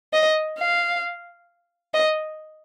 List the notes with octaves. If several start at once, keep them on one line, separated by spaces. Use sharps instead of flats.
D#5
F5
D#5